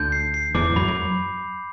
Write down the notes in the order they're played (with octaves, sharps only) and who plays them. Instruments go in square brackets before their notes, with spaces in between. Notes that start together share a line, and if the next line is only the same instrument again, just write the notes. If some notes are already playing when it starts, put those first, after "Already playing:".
Already playing: [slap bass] D2 D3 [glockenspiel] G6
[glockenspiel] C7
C7
[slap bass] E2 E3 [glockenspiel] D6
[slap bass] F#2 F#3 [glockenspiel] B5
[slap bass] F#3